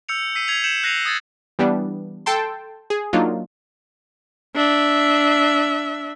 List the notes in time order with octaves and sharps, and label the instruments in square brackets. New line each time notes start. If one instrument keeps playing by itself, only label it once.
[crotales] E6 G6 C#7 F7
E6 B6 C7 D#7
G#6 C7 F7
G6 C#7 E7 F#7
F#6 A#6 C7 D#7 F7
D#6 G#6 A6
[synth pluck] E3 G3 B3 D4
A4 G5 A5 C6
G#4
F#3 A#3 D4 D#4 F4
[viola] D4 E5